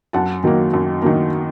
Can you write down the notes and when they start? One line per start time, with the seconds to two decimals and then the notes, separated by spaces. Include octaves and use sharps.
0.13 F#2 F#5 A5
0.44 D#3 F#3 A#3
0.74 F#2
1.02 D#3 F#3 A#3